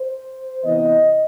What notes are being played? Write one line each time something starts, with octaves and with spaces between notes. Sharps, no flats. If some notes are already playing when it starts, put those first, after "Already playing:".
Already playing: C5
C3 E3 B3 D#5